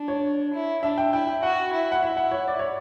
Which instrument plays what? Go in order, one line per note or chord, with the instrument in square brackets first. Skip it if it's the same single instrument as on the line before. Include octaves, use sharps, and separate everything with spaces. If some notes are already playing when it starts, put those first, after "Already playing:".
Already playing: [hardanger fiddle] D4
[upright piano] C#5
[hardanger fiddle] E4
[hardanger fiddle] D4 [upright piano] E5
[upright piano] G5
[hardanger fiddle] E4 [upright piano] G5
[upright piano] G5
[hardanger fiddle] F#4 [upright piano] F#5
[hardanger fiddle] E4
[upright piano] F#5
[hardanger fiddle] E4 [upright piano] E5
[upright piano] F#5
C#5
D5
C#5